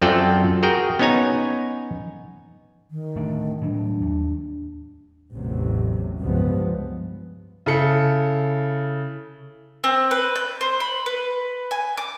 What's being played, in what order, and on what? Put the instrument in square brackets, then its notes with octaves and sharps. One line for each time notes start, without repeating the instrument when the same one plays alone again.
[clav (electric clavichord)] F#2 C4 F4 A4 D5 G5
F#4 G#4 A#4 G5
B3 C#4 D#4 C#5 G#5 A#5
[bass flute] D#3
[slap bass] D1 A3 D4
[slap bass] A2 F#3 G3 [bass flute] D4
[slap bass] D#2
[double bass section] A1 E2 A2 C3 F#3
C#2 G2 F3 G#3 B3
[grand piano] C#3 E4 A4 C#7
[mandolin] C4
B4
G6
C5
B5
B4
G#5
D6